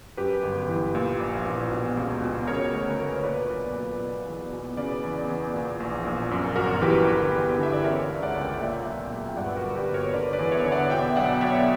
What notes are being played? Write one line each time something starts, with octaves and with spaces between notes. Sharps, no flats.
F#2 G4 B4
G1
E3
A#2
A#1
A#2
B2
C#2
B2
C#3 A#4 C#5
D2
A#4
D2 B4
C#5
A#2 B4 D5
B1
A#2
B2
E2
B2
C#3 B4 D5
E2
E2
A#2
A#1
A#2
F#2
G1 F#4 A#4
E3 G4 B4
D3
E2
D3 E5
D5
C#3 A#4 C#5
C#5 E5
C#2
D5 F#5
C#2
G5
A#2 E5 G5
B1
A#2
G5
G2 D5 F#5
B4
F#4 A#4
G1
G4 B4
G1
A#4 C#5
D3 B4 D5
B4 D5
E2
C#5 E5
D3
D5 F#5
B2 E5 G5
B1 D5 F#5
B2 C#5 E5